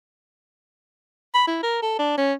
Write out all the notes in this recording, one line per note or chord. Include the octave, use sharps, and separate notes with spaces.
B5
E4
A#4
A4
D4
C#4